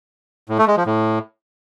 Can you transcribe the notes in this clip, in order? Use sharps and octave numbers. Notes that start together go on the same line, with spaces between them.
A2
A3
G#3
F3
A2